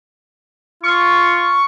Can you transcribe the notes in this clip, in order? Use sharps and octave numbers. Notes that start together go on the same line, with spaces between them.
F4 C#6